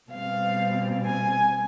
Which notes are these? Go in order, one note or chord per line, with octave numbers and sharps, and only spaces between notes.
B2 G3 C4 F5
G#5